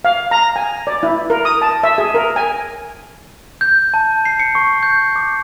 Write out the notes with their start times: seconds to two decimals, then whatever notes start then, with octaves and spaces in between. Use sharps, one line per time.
0.05 F5
0.31 A#5
0.56 G#5
0.87 D5
1.03 E4
1.30 A#4
1.45 D#6
1.62 A5
1.83 E5
1.98 G#4
2.15 A#4
2.36 G#5
3.61 G6
3.94 A5
4.25 C7
4.40 C#7
4.55 C#6
4.83 G6
5.16 D6